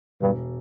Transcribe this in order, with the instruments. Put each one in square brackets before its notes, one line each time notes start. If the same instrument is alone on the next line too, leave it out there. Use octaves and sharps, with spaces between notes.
[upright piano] E1 [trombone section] G2